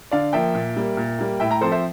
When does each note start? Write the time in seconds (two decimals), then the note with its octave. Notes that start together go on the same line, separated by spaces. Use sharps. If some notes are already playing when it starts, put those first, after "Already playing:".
0.11 D3 D5 F5
0.33 F3 A#3 E5 G5
0.54 A#2
0.77 G3 A#3
0.97 A#2
1.19 G3 A#3
1.40 A2 E5 G5
1.51 G5 A#5
1.61 F3 C4 A4 C5
1.72 C5 E5